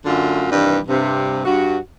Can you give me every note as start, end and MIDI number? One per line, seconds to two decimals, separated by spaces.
0.05 0.45 42
0.05 0.45 50
0.05 0.45 57
0.05 0.45 65
0.51 0.79 43
0.51 0.79 48
0.51 0.79 51
0.51 0.79 52
0.51 0.79 55
0.88 1.41 43
0.88 1.41 48
1.45 1.77 43
1.45 1.77 66